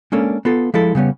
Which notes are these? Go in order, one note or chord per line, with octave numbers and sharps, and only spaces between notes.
G#3 A#3 C#4 D4 A4 A#4
B3 F4 A4
F3 G#3 E4 A4
C#3 G3 B3 C#4